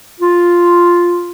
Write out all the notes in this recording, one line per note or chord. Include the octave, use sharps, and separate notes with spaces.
F4